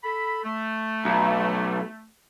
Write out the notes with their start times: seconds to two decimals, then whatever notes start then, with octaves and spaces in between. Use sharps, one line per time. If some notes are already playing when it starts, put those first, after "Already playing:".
0.02 A4 B5
0.42 A3
1.05 B1